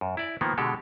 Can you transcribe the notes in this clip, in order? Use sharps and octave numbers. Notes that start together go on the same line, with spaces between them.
F#2
E4 D5
D#3 F3 A#3 B3
B2 D3 G#3 G4 A4